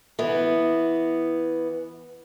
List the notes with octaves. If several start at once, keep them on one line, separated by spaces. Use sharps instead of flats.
E3 B3